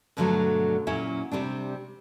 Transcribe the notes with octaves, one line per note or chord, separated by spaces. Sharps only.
G2 B2 D3 F3 F#3 A3
A#2 F#3 C#4 E4 E5
C3 G3 C4 D4